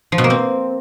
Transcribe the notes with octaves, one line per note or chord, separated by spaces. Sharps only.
F3
B2
A#3
C4